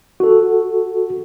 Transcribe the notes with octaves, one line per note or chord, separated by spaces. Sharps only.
F#4 A4